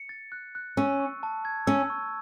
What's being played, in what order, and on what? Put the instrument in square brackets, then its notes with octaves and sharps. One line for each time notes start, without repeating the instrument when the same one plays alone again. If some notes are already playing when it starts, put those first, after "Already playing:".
Already playing: [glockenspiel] C#7
A6
F#6
F#6
[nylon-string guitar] C#4 [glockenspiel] E6
[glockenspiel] C#6
A5
G#6
[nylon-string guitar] C#4 [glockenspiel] E6
[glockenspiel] C#6